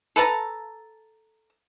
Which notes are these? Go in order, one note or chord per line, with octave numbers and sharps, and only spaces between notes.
A4 B4 A5 A#5